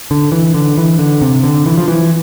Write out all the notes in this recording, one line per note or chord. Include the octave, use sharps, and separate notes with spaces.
D3
E3
D3
E3
D3
C3
D3
E3
F3
E3